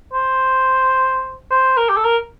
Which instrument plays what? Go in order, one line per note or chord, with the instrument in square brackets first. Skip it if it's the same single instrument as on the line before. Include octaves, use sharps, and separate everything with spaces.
[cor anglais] C5
C5
A#4
G4
A4
A#4